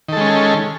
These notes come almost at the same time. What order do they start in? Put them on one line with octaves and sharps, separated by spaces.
D#3 A4 G#3 C#4